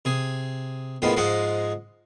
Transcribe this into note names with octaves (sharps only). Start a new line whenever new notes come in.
C3 G#4
A2 D#3 F3 G#3 B3
G#2 F3 G#3 D#5 F#5